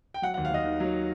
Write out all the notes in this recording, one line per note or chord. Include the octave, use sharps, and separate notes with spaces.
G5
F#3 F#5
D#2 F#5
F5
D#2 D#5
D#3
F#3